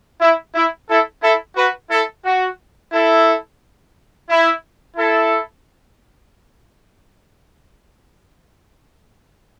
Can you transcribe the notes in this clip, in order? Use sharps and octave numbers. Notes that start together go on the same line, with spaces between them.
E4
E4
E4 A4
E4 A4
F#4 B4
E4 A4
F#4
E4 A4
E4
E4 A4